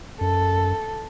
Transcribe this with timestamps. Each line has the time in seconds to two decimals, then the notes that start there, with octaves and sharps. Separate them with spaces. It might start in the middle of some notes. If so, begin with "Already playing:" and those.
0.21 F#2 A4